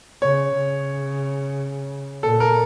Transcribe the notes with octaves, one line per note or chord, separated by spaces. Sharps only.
C#3 C#5
C#3
A#2 A4
A#4